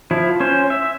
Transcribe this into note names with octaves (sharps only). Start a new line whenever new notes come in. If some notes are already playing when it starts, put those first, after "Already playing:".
F3 E4
C#4 C5
E5